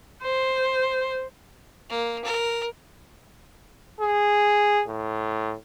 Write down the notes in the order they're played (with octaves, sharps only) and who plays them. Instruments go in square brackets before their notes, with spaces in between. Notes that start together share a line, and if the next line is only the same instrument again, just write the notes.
[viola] C5
[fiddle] A#3
A#4
[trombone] G#4
A2